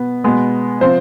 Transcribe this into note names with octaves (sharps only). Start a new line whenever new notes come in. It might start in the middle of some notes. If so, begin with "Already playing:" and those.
Already playing: B2 B3
B2 G#3 B3
C3 F3 C4 C5